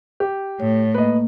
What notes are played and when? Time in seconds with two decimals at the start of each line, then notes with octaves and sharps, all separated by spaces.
0.20 G4
0.60 A2 C#5
0.94 A#3 B4 D#5